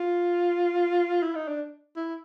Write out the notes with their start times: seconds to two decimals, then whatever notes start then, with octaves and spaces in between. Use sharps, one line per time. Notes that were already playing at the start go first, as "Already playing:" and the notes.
Already playing: F4
1.23 E4
1.35 D#4
1.48 D4
1.96 E4